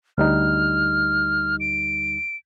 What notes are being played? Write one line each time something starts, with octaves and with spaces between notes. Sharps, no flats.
D2 G3 D#4 F6
D7